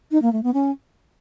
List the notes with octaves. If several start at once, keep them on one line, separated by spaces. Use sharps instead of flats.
D#4
A#3
A3
B3
C#4